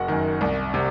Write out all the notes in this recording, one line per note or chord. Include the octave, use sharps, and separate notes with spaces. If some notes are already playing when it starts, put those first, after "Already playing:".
Already playing: F#1 F#4 F#5
F#2 D#3
C2
C3